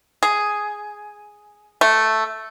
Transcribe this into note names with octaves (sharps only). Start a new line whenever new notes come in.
G#4
A3